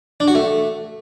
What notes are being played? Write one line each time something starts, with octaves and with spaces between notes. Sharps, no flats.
D4
F#4
A3